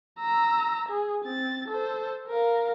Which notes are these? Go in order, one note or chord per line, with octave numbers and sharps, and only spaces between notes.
A#5 E6
G#4
C4 A6
A4 C5
A#4 F5